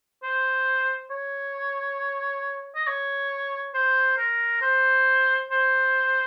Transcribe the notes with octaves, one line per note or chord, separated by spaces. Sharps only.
C5
C#5
D#5
C#5
C5
A#4
C5
C5